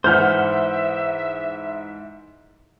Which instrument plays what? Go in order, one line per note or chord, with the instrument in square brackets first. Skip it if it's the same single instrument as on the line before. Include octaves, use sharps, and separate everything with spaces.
[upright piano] G#2 E3 [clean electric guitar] C5 [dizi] E5 [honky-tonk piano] F#5 F6 G6